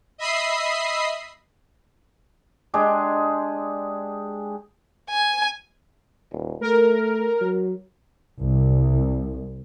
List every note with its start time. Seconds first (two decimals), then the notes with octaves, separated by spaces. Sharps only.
0.18 D#5 E5 B5 D#6 C7
2.74 G#3 D4 G4 G#4
5.10 G#5
6.32 D#1
6.61 A3 A#4
7.41 F#3
8.39 C2